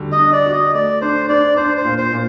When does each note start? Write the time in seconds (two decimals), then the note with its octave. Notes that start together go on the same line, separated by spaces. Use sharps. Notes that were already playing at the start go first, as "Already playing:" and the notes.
Already playing: D3 G3 F#4
0.12 D#5
0.19 D4
0.33 D5
0.46 F#4
0.53 D#5
0.74 A3 D5
1.02 D4 C5
1.29 D4 D5
1.56 D4 C5
1.77 C5
1.85 A#2
1.98 C5
2.12 A#2